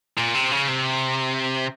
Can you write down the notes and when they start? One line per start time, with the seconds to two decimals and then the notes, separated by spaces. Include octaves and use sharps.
0.17 A#2
0.34 C3
0.52 C#3
0.68 C3